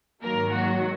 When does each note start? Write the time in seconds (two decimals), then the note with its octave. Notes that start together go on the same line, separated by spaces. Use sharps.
0.23 G#2 D#3 F#3 A#3 A#4
0.51 F#3 F#4